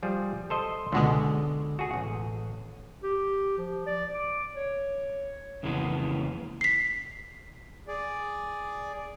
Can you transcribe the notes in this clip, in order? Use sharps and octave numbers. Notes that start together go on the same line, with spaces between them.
F3 G3 G#4
A4 C5 D#5
C#2 B2 D3 G#3
F#4 G#4
A1
G4
F3
D5
D6
C#5
F2 C#3 E3 G#3 A#3 B3
B6 C7
G#4 D5